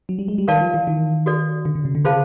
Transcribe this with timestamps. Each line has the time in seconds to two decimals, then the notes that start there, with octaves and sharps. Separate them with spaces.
0.09 F#3
0.19 G3
0.28 G#3
0.38 G3
0.48 D#3 A#4 D5 F5 A5
0.61 F3
0.74 E3
0.87 D#3
1.26 F#4 A4 D5
1.65 D3
1.75 D3
1.85 C#3
1.95 D3
2.04 C#3 F4 G#4 C5 F5 A5